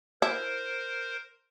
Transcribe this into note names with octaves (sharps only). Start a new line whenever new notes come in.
E4 A#4 C5